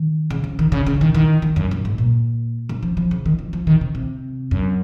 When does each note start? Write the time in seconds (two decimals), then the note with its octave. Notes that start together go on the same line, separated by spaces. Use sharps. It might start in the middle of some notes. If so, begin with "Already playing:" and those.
Already playing: D#3
0.30 C#3
0.44 F3
0.59 D#3
0.72 C#3
0.86 C#3
1.01 D#3
1.15 D#3
1.42 D#3
1.56 F#2
1.71 F#2
1.85 G#2
1.98 A#2
2.69 F#2
2.83 F3
2.97 F3
3.11 C#3
3.26 D#3
3.39 F3
3.53 F3
3.67 D#3
3.81 C3
3.95 C3
4.51 F#2